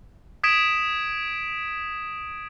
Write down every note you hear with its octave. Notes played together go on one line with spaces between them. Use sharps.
D#6 G#6 B6 D7 E7